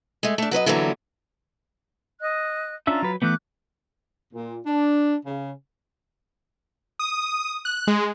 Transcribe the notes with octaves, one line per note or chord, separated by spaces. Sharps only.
G#3 A3
A3 D4
F#3 B4 C#5 D#5
D3 E3 F#3 G3 A#3 B3
D#5 F#6
C#4 D4 F4 E5 A#5
F#3 B4
E3 A3 B3 D6 F#6 G6
A#2
D4
C#3
D#6
F#6
G#3